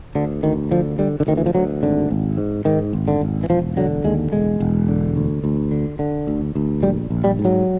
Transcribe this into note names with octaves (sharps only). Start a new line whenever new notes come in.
D2 D3
D2 D#3
D3 F3
D3 G3
D3
D2 D#3
E3
F3
D2 F#3
G#1 D3
G#1
G#2
G#2 D#3
G#1
D3
G#1
E3
E1 F3
D3 F#3
D#2 G#3
E1 G#3
E1
D3
D2
D2
D3
D3
D2
D2
A#1 G3
A#1
G3
G#2
F#3